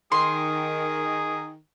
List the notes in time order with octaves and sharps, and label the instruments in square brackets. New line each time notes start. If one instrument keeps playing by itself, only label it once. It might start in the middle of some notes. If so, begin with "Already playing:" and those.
[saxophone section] D#3 [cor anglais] G#4 [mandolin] C6